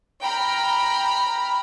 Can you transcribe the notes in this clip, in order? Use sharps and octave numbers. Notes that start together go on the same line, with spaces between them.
G5 A#5 B5 F6